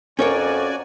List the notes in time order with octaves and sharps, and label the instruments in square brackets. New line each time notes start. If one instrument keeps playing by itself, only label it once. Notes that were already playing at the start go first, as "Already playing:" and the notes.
[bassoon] F2 [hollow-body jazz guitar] C#4 A#4 C#5 [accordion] F#4 D5 G#5